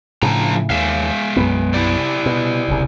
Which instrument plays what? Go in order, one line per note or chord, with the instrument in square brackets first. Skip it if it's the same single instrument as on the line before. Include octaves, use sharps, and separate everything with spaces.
[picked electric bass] A2 C#3 [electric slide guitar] F3 D4 A#5
[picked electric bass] D#2 [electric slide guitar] G#3 E5 F5
[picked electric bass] B1 F#2 B3
[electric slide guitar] E4 G4 D5
[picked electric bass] B2
E1 C2 C#3